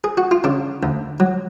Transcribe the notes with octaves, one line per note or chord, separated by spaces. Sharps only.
G#4
F#4
F4
C#3 D4
D2
F#3